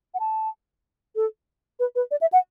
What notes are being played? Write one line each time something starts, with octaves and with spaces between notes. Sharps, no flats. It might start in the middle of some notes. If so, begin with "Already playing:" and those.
F#5
A5
A4
B4
B4
D5
E5
F#5